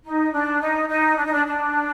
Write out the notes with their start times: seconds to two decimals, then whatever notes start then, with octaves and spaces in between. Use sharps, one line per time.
0.04 D#4
0.32 D4
0.61 D#4
0.89 D#4
1.17 D4
1.25 D#4
1.32 D4
1.45 D4